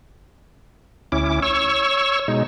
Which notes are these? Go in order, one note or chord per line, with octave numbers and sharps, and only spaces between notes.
D2 C#4 E4 D6
C#5 C#6 E6
B2 G#3 D#4